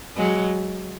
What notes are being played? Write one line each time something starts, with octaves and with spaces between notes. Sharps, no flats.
F#3 G#3